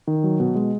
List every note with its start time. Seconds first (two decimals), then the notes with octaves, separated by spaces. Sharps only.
0.07 D#3
0.24 F#3
0.40 B2
0.55 G#3